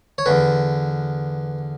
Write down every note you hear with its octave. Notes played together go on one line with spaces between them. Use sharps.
C#5
E2 D3 B4